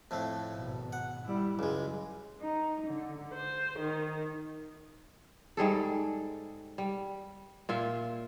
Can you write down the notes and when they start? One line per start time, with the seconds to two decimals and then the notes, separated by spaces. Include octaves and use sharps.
0.11 F2 A2 A3
0.52 G#1 B2
0.93 F#5
1.26 G3 E4
1.59 C#2 F#2 G#3
2.40 D#4
2.87 D3
3.35 C5
3.79 D#3
5.57 G#2 G3 G#4 A4
6.78 G3
7.69 A#2 F4 E5